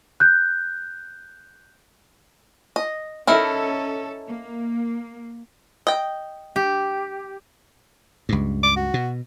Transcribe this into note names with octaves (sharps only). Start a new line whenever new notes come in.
F#6 G6
D#5
C#4 D#4 E4 A4 A#4
A#3
D#5 G5
G4
C#2 G2
D6
F#4
B2